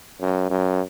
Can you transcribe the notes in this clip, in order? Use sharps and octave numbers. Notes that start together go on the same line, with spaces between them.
F#2
F#2